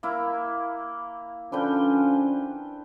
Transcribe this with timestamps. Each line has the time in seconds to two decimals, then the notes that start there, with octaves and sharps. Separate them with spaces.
0.03 A#3 E4
1.52 D3 F3 C#4 D4 B4 G5